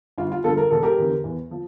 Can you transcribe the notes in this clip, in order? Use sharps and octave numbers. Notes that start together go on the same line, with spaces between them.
G1 F4
F4
G2 D3 F3 F4 A4
A#4
E1 A4
G4 A#4
E2 D3
E2
F3